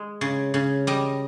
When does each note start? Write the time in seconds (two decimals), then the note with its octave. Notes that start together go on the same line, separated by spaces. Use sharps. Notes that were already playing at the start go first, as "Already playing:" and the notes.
Already playing: G#3
0.21 C#3
0.54 C#3
0.87 G3 D#5